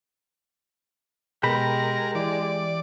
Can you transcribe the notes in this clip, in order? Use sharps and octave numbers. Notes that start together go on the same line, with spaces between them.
B2 G#3 G4 A#4 B5
E3 D5